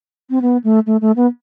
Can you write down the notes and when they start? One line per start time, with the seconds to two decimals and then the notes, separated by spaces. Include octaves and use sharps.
0.30 C4
0.42 B3
0.64 A3
0.86 A3
1.01 A3
1.16 B3